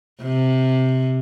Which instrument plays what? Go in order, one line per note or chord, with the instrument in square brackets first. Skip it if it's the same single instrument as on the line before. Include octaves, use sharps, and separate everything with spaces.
[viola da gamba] C3